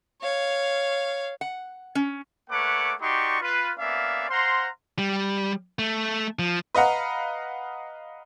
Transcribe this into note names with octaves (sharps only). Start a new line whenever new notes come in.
C#5 F5
F#5
C#4
A3 A#3 B4 C#5 F#5 D6
D#4 F#4 G4 D5 C6 C#6
F4 B4
A#3 B3 C#4 D5 E5 F5
C5 F5 F#5 A#5 C6
G3
A3
F3
B4 D#5 F5 F#5 A#5